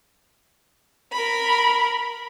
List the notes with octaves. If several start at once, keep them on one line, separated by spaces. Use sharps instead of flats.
A#4 B5